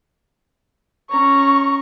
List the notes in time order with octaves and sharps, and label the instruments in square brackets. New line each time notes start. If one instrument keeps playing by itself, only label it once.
[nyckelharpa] C#4 A#5 [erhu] C#6